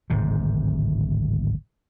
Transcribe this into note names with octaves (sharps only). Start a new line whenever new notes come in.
D1 G#1 G#2 C3